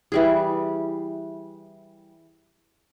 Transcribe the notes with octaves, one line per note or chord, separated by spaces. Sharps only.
E3 G3 G#4